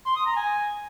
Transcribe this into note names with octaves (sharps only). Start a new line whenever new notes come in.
C6
D#6
A#5
G#5